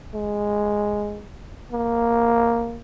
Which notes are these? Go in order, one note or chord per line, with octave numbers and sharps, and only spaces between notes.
G#3
A#3